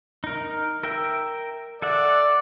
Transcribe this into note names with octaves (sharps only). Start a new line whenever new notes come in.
D#4 A#4
A#4 E5 G5
A4 D5 E5 F#5